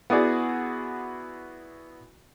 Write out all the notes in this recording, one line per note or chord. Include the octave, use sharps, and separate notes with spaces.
B3 E4 F#4 G#4 D5